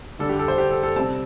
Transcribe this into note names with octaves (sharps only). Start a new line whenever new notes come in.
D3 G3 D4 A4
G4
A4
C5
G4
A4
A4
C3 G3 C4 A5